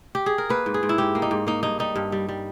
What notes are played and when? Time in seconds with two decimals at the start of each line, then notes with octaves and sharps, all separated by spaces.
0.15 G4
0.26 G#4
0.38 A#4
0.49 A#3 B4
0.66 G#2
0.74 G#4
0.83 G#2
0.89 E4
0.98 G#2 G4
1.15 A#3
1.22 D#4
1.31 G#2
1.47 A#3 D#4
1.63 G2 D#4
1.79 G3 D#4
1.96 G2
2.12 G3
2.29 G3